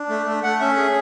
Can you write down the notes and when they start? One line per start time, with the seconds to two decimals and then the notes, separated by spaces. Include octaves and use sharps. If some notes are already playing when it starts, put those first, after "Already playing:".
Already playing: D4
0.09 A3
0.26 A3
0.43 A3 F#5
0.60 C#4 E5
0.77 G#4